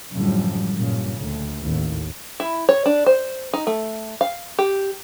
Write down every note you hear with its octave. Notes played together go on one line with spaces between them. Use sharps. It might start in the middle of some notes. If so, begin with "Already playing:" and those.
F#2 A2 D3 F3 G3
G2 A#2 C#3
D2
A1 D#2
E4
C#5
D4
C5
D#4
A3
F5
G4